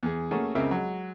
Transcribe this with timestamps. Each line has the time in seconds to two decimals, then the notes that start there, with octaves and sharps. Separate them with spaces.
0.03 E2 G#4
0.31 A3 A#3 C#4 F#4 G#4 A4
0.55 C#2 C#3 C4 A#4 E5
0.71 F#3 G#3